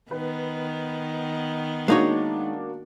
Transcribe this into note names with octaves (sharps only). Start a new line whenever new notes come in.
D#3 B3 B4
G#3 A#3 D4 D#4 F#4 C#5